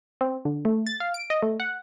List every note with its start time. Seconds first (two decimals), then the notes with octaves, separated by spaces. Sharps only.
0.21 C4
0.45 D3
0.65 A3
0.86 A6
1.00 F5
1.14 D7
1.30 D#5
1.43 A3
1.60 F#5